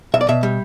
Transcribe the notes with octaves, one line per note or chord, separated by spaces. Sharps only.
B1 E5
D5
B2 E5
G3